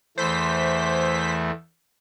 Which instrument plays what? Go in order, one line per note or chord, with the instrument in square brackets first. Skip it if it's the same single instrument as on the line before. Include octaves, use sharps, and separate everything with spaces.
[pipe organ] E2 E3 A3 [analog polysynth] C5 B6